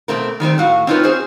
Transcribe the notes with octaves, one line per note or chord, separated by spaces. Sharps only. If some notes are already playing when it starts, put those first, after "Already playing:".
B2 A3 C4 A#4
D#3 G3 A3 C4
A2 F#4 F5
C4 C#4 D#4 F4 A#4 B4
C4 F#4 G#4 C5